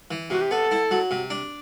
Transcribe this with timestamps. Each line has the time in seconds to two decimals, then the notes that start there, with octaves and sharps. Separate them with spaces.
0.11 E3
0.30 C3 F#4
0.41 G4
0.51 B3 A4
0.71 E4
0.91 F#3
1.11 C3
1.30 D4